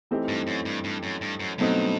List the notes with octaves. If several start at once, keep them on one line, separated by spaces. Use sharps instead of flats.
E3 A3 C4 D#4 G4
G2
F#2
G2
G2
F#2
G2
F#2
G2 B2 F#3 A3 C4 D#4